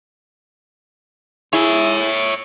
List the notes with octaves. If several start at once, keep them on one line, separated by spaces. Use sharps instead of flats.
E4 G#4 C#5 E5